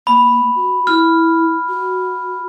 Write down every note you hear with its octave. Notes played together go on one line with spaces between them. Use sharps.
A#3 B5
F#4
E4 F6
F#4